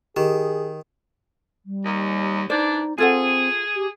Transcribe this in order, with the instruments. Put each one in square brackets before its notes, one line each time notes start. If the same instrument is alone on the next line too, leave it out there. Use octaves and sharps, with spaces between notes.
[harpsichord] D#3 [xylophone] G4 [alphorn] G#4
[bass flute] G3
[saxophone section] D#2
[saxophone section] E3 D4 [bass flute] D#4 [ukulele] C5 D5
[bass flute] C4 [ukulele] F4 A4 F#5 [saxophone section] G#4
[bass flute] G4